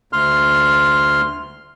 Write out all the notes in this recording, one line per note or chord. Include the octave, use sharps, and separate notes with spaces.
D2 C6 F6